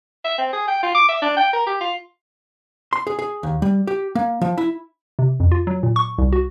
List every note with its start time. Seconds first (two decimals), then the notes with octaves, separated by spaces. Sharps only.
0.25 E5
0.38 C4
0.53 G#4
0.68 G5
0.83 F4
0.95 D6
1.09 E5
1.22 D4
1.37 G5
1.53 A#4
1.67 G4
1.81 F4
2.93 C6
3.07 G#4
3.19 G#4
3.43 D#2
3.62 G3
3.87 G4
4.15 A#3
4.41 F3
4.58 E4
5.19 C3
5.40 F2
5.52 F4
5.67 F#3
5.83 A#2
5.96 C#6
6.18 C2
6.33 F#4